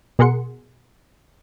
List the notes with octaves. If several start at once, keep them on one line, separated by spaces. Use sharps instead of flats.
B2 G#4 A#4 F#5 C6 C#7